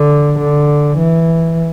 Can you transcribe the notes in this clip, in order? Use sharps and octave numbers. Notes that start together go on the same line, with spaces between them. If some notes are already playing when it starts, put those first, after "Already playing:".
Already playing: D3
D3
E3